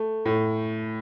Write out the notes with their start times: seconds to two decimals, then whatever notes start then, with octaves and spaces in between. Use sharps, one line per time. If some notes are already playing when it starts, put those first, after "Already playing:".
Already playing: A3
0.25 A2